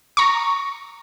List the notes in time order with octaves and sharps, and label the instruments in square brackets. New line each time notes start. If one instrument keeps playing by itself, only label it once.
[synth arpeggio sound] A#5 C#6